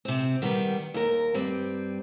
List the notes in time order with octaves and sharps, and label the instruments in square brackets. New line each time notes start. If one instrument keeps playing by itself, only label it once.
[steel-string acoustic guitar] C3 C4
D#3 G3 B3
D#2 A#4
G2 G3 C4